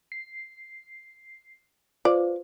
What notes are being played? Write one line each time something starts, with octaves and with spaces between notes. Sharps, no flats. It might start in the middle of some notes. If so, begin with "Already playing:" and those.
C7
F4 B4 C5 D5